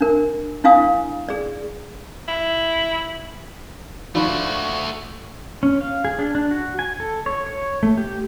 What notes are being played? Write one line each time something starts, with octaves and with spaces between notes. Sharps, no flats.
D4 A#4
D4 E4 F5 G#5 D#6
G#4 D5
E4
F3 A3 D4 F#4 B5
C#4
F5
G#4
D4
D4
F#4
G#5
A4
C#5
C#5
A3
G4